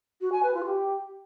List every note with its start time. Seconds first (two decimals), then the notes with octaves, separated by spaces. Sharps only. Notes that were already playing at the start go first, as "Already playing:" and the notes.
0.21 F#4
0.32 G#5
0.43 B4
0.54 F4
0.65 G4